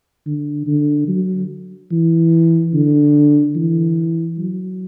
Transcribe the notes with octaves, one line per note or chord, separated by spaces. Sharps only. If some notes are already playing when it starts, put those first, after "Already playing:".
D3
D3
F#3
E3
D3
E3
F#3